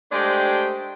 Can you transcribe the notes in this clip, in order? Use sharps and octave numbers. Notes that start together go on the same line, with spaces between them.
G#3 A3 D4 G4 C5 G5